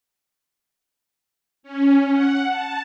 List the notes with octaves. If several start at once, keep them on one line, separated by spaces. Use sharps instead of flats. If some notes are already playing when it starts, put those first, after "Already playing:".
C#4
F#5
A5